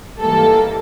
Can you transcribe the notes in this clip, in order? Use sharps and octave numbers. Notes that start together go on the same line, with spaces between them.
G#2 E3 G3 A#3 A4